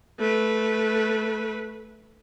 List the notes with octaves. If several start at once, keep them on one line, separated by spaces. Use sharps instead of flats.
A3 B4